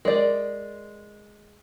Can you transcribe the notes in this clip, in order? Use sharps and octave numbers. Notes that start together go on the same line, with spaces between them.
G#3 A#4 D5